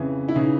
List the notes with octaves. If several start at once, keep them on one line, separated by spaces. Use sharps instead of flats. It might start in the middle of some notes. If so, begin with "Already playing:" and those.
Already playing: F2 C#3 E3
E4
C#3 E3 D#4